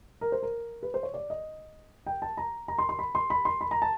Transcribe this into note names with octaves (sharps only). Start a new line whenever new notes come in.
A#4
C5
A#4
B4
C5
C#5
D5
D#5
G5
A5
A#5
A#5
C6
C6
B5
C6
B5
C6
B5
A#5
A5